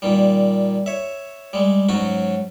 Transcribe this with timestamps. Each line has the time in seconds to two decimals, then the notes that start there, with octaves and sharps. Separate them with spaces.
0.02 A#2 D#3 G3
0.86 C#5 E5
1.53 G3 G#3
1.89 G#2 F#3 C#4 F#4